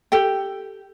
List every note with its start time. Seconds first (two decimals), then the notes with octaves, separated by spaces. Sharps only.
0.12 G4 A4 G5